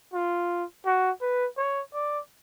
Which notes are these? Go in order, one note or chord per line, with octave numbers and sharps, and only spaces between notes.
F4
F#4
B4
C#5
D5